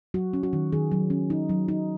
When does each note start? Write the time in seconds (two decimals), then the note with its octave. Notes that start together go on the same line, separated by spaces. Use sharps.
0.14 F#3 F#4
0.33 C#4
0.43 F#4
0.53 D#3
0.72 D#3 G#4
0.92 F#3
1.10 C#4
1.30 D#4
1.49 F#3
1.68 D#4